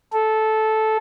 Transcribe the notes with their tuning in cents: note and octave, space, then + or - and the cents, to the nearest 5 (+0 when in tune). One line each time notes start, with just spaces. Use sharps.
A4 -10